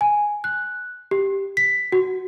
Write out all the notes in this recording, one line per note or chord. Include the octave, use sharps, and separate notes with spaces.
G#5
F#6
G4
B6
F#4